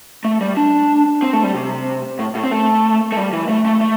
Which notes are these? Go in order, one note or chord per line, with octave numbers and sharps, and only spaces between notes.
A3
G3
D4
C4
A3
G3
C3
A2
A2
C4
A3
A3
G3
E3
A3
A3
A3